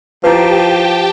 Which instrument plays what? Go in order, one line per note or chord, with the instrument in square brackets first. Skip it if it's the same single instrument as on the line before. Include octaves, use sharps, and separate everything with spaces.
[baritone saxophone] F3 [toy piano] E4 B4 [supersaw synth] G4 G5 A5